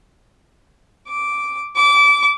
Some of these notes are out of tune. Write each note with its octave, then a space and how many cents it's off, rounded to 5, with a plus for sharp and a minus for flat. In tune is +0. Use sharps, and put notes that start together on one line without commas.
D6 -5
D6 -25